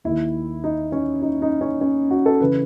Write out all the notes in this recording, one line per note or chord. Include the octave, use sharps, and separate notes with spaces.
D#2 D#3 E4
D#4
C#4
D#4
D#4
C#4
C#4
F#4
A4
C#3 E3 B4